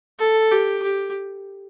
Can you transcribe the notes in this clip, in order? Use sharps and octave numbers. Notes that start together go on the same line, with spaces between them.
A4
G4
G4